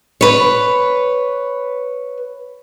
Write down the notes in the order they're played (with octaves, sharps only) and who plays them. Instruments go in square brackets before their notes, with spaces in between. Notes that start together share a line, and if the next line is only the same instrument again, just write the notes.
[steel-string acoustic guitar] B4 C#5